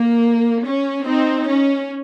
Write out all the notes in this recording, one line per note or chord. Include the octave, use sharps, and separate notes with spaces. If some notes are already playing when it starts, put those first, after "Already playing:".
Already playing: A#3
C#4
C4 D#4
C#4